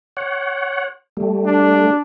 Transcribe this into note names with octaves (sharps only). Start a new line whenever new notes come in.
C#5 F#5
G3 A3
D4